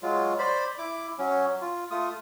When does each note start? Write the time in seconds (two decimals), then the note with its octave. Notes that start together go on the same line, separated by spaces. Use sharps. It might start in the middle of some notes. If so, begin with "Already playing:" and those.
0.02 F#3 G#3 F4
0.39 C5 D5 B5
0.78 E4 D6
1.19 F#3 C#4
1.61 F4
1.91 A3 F4 D#6